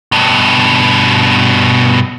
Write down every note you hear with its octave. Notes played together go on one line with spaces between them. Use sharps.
G2 B2